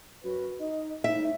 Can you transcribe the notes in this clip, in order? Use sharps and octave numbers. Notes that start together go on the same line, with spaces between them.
F#2 C#4 F#4 B4
D#4 D#5
C2 F2 A2 D#4 E5